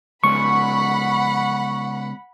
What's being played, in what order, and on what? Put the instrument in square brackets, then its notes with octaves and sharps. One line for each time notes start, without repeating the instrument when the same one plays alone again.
[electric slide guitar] C#3 G#3 B3 [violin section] F#5 B5 [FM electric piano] C#6